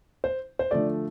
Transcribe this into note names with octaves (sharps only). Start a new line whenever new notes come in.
C5
C5
D3 F3 A3 D5